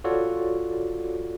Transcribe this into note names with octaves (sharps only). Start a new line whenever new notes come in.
F4 F#4 A4 C#5 D5